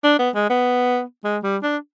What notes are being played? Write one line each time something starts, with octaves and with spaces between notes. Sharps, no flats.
D4
B3
G#3
B3
G#3
G3
D4